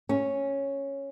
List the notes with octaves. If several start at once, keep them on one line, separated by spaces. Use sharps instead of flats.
C#4